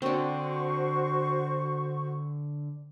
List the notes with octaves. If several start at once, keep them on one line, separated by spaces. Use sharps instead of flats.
D3 C4 D4 F#4 C5 C#6